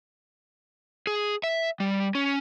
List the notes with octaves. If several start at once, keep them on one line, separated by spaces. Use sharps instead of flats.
G#4
E5
G3
C#4